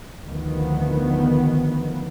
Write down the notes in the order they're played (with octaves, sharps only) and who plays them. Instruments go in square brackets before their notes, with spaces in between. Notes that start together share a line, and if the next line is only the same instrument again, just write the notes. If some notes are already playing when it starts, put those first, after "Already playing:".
[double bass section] D2 D#3 F3 B3